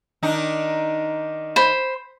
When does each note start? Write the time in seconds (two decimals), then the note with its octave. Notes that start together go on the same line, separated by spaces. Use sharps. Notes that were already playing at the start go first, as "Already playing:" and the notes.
0.23 D#3 D4 D#4
1.56 C5 B5